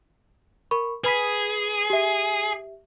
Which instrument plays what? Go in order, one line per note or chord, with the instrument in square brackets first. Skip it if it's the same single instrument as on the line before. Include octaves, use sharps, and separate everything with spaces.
[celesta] A#4 B5 C#6
[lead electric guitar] G#4 [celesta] B4 B5 B6
[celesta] G4 E5